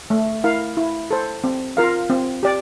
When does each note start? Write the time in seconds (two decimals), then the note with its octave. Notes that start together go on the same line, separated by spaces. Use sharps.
0.10 A3
0.44 E4 A#4 F5
0.77 E4
1.11 A4 C5
1.44 C4
1.77 F4 A#4 F5
2.10 C4
2.43 G4 D5